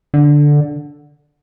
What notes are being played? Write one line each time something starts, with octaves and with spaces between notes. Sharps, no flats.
D3